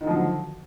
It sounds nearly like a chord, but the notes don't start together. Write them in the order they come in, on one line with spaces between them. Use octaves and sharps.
D#3 D3 F3 F#3